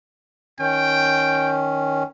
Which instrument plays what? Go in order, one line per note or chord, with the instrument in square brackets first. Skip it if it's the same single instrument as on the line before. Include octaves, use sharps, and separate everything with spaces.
[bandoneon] D#3 C#4 [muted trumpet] G5